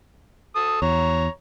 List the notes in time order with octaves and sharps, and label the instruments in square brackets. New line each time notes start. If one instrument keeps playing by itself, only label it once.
[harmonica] A4 D#6
[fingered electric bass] E2 [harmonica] C#5 A#5